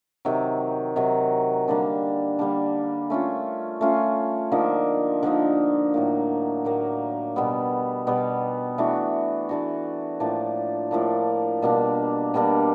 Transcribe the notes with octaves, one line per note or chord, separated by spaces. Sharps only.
C3 D#3 F#3
C3 D#3 F#3
D3 G3 A#3 D4
D3 G3 A#3 D4
A3 C#4 F4
A3 C#4 F4
D3 F3 A#3 D#4
D3 F3 A#3 D#4
A2 F#3 A#3
A2 F#3 A#3
B2 G3 B3
B2 G3 B3
E3 A3 D4 F#4
E3 A3 D4 F#4
A2 F3 A#3 D4
A2 F3 A#3 D4
B2 G3 A#3 D4
B2 G3 A#3 D4